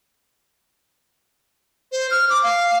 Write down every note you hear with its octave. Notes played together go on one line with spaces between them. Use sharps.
C5
F6
D6
F5